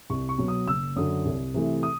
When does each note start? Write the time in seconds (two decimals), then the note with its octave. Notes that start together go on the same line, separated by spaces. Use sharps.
0.10 C2 C#6
0.29 C#6
0.38 B2 F#3
0.48 D#6
0.67 F#1 E6
0.96 F#2 D3 F#3 D#6
1.25 C2
1.54 C3 E3 A3
1.83 D#6